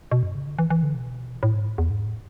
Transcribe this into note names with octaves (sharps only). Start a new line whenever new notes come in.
B2
F#2
C#3
D3
E3
E3
D3
B2
A2
G#2
E2
G#2
A2